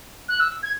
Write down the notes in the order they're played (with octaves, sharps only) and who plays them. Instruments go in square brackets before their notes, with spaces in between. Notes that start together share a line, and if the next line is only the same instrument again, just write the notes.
[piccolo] F#6
E6
G#6